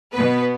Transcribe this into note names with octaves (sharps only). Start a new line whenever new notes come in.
B2 B3 B4